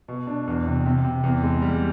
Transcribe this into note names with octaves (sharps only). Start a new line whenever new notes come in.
B2
D4
E2
C3
C3
C3
E2
G#3
G3